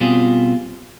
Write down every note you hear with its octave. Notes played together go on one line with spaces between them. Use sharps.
B2 G3 C4 F4 G#4